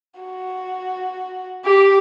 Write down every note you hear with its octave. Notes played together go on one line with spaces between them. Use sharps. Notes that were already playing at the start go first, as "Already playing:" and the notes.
F#4
G4 D6